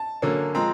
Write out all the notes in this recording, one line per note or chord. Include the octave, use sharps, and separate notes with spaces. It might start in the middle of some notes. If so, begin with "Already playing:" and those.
Already playing: A5
D3 F#3 A#3 C#4
F3 G#3 C4 A#5